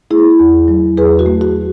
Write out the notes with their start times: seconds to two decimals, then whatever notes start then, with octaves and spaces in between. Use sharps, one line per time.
0.11 A3 E4 G#4
0.40 E2
0.68 F#3
0.97 E2 G#4 B4
1.19 F#4
1.26 A3
1.41 F#4